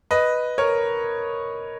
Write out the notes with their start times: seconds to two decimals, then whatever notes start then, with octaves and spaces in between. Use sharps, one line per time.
0.11 B4 D#5
0.58 A#4 C#5